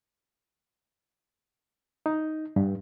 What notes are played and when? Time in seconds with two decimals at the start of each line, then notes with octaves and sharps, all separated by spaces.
2.06 D#4
2.56 G2